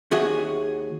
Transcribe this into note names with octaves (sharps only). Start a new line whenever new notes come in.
D#2 F#4 G#4 E5